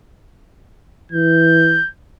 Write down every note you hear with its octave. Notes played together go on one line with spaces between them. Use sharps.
E3 G6